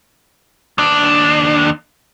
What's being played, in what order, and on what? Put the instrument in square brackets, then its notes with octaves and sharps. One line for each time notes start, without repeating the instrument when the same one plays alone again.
[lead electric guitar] D#2 D4